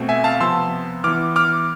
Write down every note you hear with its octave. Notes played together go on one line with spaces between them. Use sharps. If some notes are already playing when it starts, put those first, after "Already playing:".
Already playing: B2 A3 C4
E5 G#5
F5 A5
C3 F3 B3 C6 E6
E3 B3 D6 F6
D6 F6